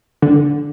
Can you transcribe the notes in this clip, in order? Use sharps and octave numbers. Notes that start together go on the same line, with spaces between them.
D3